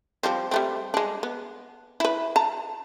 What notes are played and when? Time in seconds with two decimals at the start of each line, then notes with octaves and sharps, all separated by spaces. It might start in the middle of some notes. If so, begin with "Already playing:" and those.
0.23 F3 G3 C4
0.51 G3 A3 C4
0.94 G#3 D4
1.23 B3
2.00 E4 B4
2.36 A5 A#5